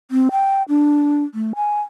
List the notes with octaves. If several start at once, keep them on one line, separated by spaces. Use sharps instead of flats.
C4
G5
D4
A3
G#5